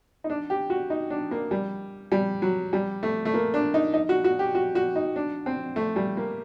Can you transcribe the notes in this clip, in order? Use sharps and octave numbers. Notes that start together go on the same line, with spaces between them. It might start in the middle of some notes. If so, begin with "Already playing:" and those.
D#4
D4
G4
F#4
D#4
D4
A#3
G3
G3
F#3
G3
A3
A3
A#3
D4
D#4
D#4
F#4
F#4
G4
F#4
F#4
D#4
D4
C4
A3
G3
A#3